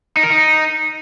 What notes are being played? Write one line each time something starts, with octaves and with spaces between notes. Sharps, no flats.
D#4
A#4
D#4